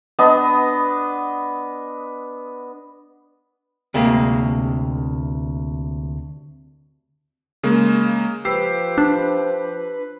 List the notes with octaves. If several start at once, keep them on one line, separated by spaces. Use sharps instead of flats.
B3 D4 D#5
D2 C3 G#3 A#3
C#3 G#3 A#3
F3 G4 B4 E6 C7
D4